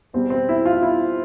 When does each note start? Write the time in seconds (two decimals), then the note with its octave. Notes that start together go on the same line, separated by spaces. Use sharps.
0.13 E2 B2 G3 C4
0.30 C4
0.49 E4
0.65 F4
0.83 E4